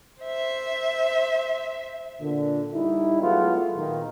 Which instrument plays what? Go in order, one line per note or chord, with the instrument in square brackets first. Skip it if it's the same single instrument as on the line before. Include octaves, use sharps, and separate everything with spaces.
[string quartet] C5 E5
[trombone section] A#2 D3
G3 D#4 E4
F#3 G#3 A3 B3 F4
A#2 D#3